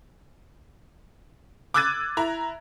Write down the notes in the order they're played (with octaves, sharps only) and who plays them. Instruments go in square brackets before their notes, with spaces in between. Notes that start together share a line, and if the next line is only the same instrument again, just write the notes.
[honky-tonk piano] D6 E6 F#6 G#6 A6 D#7
E4 A#5